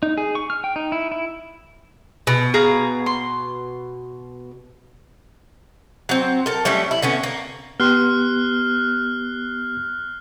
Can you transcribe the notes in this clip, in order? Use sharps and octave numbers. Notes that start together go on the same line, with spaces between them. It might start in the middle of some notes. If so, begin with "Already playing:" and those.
D#4
G#4
C#6
F6
G5
D#4
E4
E4
B2
G#4 F5 A#5
C6
F#3 C4
A4 A#4
F#3 G3 A3 C#4
E4
D3 B3 C#4
A#3
B3 G4 C6 F6 F#6 C7